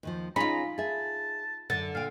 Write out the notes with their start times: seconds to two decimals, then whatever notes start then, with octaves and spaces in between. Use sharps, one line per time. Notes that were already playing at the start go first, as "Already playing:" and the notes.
0.03 D#2 D#3 F3
0.36 C#4 D#4 F4 G#4 A#5 B5
0.78 G#4 E5 A5
1.70 F#2 D3 A6
1.95 A#2 F5 G5